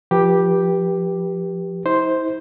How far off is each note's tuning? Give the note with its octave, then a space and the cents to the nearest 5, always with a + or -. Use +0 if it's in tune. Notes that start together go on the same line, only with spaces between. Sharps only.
F3 +0 G4 +0 B4 -25
E4 -40 C5 +0